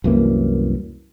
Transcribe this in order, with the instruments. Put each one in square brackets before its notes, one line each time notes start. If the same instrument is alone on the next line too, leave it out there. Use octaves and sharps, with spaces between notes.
[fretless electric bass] C2 F#2 E3 A#3